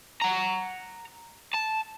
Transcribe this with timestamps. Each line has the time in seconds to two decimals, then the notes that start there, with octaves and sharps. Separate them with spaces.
0.22 F#5 A#5
1.54 A5